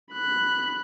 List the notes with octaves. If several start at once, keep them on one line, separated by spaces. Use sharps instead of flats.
B5 F#6